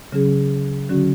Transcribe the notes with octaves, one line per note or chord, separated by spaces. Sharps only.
C#3 F#3 C#4 G#4
D3 F#3 C#4 F#4